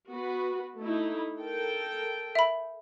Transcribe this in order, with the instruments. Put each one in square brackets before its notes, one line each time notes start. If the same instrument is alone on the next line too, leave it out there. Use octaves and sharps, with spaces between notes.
[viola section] B3 F#4 B4
A3 D#4 E4
A4 A#4 G5
[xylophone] E5 B5